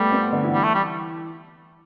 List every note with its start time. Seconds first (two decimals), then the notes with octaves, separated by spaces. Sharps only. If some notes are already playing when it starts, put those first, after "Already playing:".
Already playing: G3 A3 B3 A4
0.12 C4
0.22 B3
0.32 D3 D4
0.44 E3 E4
0.54 G3
0.64 A3
0.74 G3